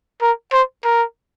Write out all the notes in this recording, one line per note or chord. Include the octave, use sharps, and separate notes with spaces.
A#4
C5
A#4